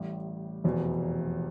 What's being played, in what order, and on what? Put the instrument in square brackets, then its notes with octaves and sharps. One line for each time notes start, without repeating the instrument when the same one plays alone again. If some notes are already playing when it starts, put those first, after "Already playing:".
Already playing: [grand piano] A1 A2 G3
F1 E2 B2